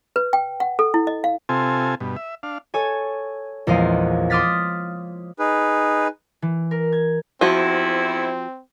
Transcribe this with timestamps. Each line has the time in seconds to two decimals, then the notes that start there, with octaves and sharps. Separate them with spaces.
0.16 B4
0.33 G5
0.60 F#5
0.79 A4
0.94 E4
1.07 D#5
1.24 F5
1.49 C3 C4 F4 A4 G#5
2.00 G2 B2
2.16 E5
2.43 D4 F5
2.74 A4 C#5 G#5
3.67 A#1 E2 G#3 C5 F5 D#7
4.30 C6 D6 D#6 F6 A6 B6
5.38 D#4 G#4 B4
6.42 E3
6.71 A#4
6.92 G#6
7.41 E2 F3 C4 E4 F#4